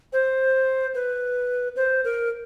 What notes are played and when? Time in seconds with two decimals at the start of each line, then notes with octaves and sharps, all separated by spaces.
0.13 C5
0.95 B4
1.76 C5
2.04 A#4